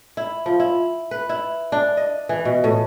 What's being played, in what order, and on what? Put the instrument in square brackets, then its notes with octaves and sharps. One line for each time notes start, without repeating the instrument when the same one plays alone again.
[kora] E4
F3
E4
B4
E4
D4
D#5
E3
B2
A2